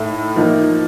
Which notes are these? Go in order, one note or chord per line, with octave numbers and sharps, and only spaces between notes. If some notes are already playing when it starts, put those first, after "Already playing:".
Already playing: A2 A3 D#4
F3 A#3 D#4